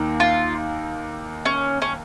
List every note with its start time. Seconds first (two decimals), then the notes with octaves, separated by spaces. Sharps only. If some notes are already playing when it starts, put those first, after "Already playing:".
Already playing: D#2 D#3 A#3
0.20 F4
1.45 C#4
1.82 C#4